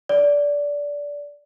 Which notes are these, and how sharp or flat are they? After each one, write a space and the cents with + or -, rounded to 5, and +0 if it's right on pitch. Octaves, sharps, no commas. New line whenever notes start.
D5 -20